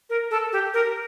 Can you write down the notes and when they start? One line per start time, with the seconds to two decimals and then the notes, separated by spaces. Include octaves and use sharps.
0.10 A#4
0.31 A4
0.52 G4
0.74 A#4